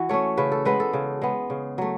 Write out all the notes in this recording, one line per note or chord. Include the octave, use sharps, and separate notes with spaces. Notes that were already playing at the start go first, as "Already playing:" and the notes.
Already playing: E3 F#4
A3 C#4 C#5
C#3 B4
A4
G#3 B3 B4
A4
C#3
G#3 B3
C#3
F#3 A3